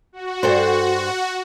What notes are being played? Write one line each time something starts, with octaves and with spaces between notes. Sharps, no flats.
F#4
G2 A4 C5